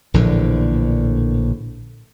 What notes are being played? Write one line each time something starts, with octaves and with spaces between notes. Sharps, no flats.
A#1 A2 D3 E3